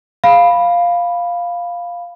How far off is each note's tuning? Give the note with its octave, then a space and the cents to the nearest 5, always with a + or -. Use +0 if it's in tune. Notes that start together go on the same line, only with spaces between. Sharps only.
F5 +0 B5 -5